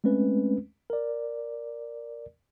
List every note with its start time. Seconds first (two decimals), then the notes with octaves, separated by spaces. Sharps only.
0.04 G#3 A3 C4 C#4 B4
0.90 A#4 D5